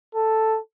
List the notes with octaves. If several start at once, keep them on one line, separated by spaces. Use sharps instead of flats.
A4